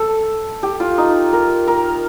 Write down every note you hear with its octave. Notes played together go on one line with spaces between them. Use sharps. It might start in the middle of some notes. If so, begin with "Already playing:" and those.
Already playing: A4
G4
F4
D#4
A#4
A#4